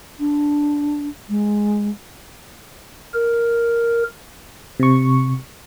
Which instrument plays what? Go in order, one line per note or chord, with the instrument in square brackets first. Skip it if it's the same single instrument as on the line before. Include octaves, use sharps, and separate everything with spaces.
[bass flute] D4
G#3
[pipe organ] A#4
[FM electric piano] C3 C#6